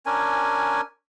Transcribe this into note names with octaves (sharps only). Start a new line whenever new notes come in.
C#4 D4 A#4 G#5